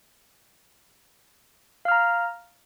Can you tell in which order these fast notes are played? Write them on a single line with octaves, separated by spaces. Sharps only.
F5 F6 A#5